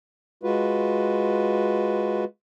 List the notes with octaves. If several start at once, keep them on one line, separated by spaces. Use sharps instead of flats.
G#3 F4 F#4 B4